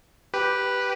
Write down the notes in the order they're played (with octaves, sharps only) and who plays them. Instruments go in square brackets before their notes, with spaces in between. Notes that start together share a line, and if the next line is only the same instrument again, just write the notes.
[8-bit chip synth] G4 B4